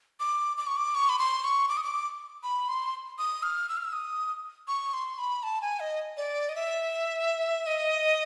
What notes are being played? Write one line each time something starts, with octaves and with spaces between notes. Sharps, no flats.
D6
D6
C#6
D6
C#6
B5
C6
C#6
D6
D#6
D6
B5
C6
D#6
F6
E6
F6
E6
D#6
C#6
C6
B5
A5
G#5
D#5
D5
D#5
E5
D#5